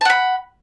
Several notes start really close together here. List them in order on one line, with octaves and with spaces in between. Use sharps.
A5 F#5 B5